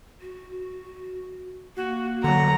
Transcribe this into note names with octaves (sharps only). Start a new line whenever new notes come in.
F#4
A#3 F#4
D3 F#3 F#5 A#5